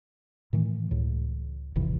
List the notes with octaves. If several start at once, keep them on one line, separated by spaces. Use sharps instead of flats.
A2 D#3 E3 A3
C#2 A2
G1 D#2 C3 E3